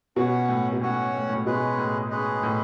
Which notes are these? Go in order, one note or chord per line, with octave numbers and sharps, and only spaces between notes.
B2 C#4 F#4 C#5 F#5
A2
B2
A2 C#4 F#4 C#5 F#5
A2
A2
B2 G#3 C#4 G#4 B4 D#5
A2
G#3 C#4 G#4 B4 D#5
A2